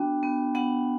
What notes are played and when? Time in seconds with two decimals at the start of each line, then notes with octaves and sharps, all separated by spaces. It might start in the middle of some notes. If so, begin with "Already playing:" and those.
Already playing: B3 D4 F#4 G5
0.23 B3
0.55 B3 F#5